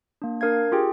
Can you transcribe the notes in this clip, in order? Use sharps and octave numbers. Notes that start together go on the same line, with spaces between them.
A#3 D4
D4 A#4 F5 G#6
F4 G4 G#4 G5